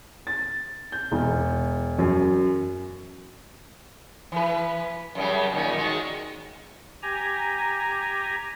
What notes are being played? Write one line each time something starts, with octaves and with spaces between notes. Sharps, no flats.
A6
G6
E1
F#2
E3 B4
F#2 C#3 G3
A#2 D#3 C#4
D#3 G#3 F#4
G4 G#5 A#5